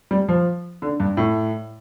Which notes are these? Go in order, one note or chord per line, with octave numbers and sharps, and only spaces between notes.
G3
F3
D3
G2
A2